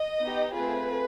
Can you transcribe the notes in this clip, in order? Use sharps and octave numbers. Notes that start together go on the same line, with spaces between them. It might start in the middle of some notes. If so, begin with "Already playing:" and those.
Already playing: D#5
B3 D#4 G4
A3 C4 F4 G#4 B4